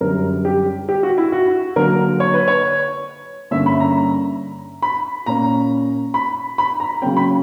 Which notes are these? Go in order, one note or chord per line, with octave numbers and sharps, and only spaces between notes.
F#2 D3 G3 A#4
G4
G4
F#4
E4
F#4
D3 F#3 A#3 A#4
C#5
B4
C#5
G2 D3 A#3 C#4 E5
B5
A#5
B5
A#2 A#3 C#4 A#5
B5
B5
A#5
C#3 F#3 A#3 C#4 G5
B5